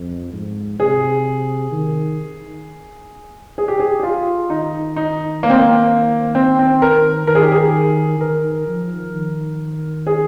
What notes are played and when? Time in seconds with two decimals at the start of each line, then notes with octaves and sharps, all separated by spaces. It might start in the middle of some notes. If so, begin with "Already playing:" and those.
Already playing: F2
0.33 G#2
0.79 C3 G#4
1.72 D#3
3.58 G#4
3.68 G4
3.80 G#4
4.00 G4
4.03 F4
4.50 D#3 D#4
4.96 D#4
5.43 A#3
5.50 C4
5.58 A#3
6.35 C4
6.59 C4
6.82 A#4
7.27 D#3 A#4
7.35 G#4
7.43 G4
7.52 G#4
8.20 D#3 A#4
8.68 F3
9.14 D#3
10.07 G#4